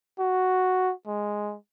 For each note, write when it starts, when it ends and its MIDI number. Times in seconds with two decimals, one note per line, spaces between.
0.19 0.93 66
1.06 1.56 56